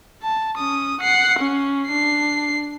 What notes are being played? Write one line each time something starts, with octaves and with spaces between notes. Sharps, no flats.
A5
C#4 D#6
F#5 C7
C#4
D4 C7